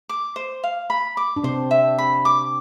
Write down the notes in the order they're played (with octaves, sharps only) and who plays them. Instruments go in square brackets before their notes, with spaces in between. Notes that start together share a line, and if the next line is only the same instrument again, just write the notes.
[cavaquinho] D6
C5
F5
B5
D6
[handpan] D4
[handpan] C3 C4 [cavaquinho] C5
[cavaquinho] E5
B5
D6